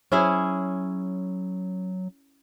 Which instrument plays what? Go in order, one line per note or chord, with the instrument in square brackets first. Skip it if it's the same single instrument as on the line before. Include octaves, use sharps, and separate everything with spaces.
[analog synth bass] F#3 [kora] C#4 E4 G#4